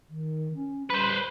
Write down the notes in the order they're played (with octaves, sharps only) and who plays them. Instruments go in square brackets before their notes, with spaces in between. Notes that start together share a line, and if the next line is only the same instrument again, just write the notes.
[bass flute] D#3
C#4
[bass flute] G3 [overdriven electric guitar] B4 C5